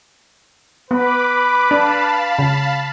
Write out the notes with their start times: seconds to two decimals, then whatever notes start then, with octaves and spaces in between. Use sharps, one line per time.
0.91 B3 B4 B5 D6
1.71 D4 F5 A5 B5
2.39 C#3